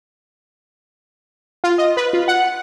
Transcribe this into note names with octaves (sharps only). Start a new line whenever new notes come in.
F4
D#5
B4
F4
F#5